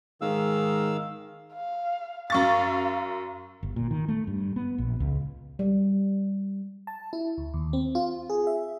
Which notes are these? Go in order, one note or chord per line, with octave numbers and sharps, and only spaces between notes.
G#2 D#3 F5 E6
F5
F#2 F5 C#6 A6
G1
A#2
D#3
A3
G2
B3
A#1
C#2
G3
A5
E4
D2
D#2
C4
F4
G#4
E5